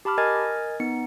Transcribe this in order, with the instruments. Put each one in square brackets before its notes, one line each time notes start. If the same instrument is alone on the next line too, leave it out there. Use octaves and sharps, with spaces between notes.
[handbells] G4 A5 B5 D6 F6
A#4 D#5 G#5 F6 G#6 A6
B3 D#4 C#7